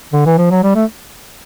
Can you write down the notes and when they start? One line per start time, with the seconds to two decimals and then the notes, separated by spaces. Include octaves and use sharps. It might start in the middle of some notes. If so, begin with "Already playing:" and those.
0.13 D3
0.26 E3
0.38 F3
0.51 F#3
0.63 G3
0.75 A3